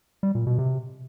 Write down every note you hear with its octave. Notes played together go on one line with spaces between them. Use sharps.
G3
A#2
B2
C3